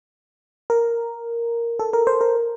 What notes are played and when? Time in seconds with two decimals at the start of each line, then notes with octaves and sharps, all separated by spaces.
0.70 A#4
1.79 A4
1.93 A#4
2.07 C5
2.21 A#4